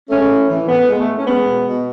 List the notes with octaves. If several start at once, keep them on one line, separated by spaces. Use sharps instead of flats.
G#3 A3 C#4
A2
E3
A2 B3
G#3
A3
A2
C#4
G#3 B3
B2
B2